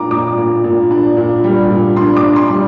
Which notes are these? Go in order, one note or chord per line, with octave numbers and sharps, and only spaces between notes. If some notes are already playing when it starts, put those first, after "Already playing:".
Already playing: A#2 D4 A#5 D6
A#2 D6
A#2
A#2
D4
A#2
G3
A#2
D4 C6
D6
D4
C6
G3